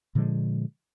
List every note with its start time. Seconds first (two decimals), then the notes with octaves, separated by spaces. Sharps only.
0.15 A#2 D3 F3 G#3